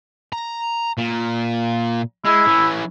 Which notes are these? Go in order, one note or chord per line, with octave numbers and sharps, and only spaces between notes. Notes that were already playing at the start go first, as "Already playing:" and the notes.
A#5
A#2
G#3 E4
E3 C#4